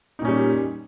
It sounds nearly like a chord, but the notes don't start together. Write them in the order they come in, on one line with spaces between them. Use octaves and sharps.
D#4 A#2 C#4 G3